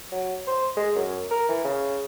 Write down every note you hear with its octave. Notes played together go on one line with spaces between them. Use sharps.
F#3
C5
G#3
F#2
A#4
E3
C#3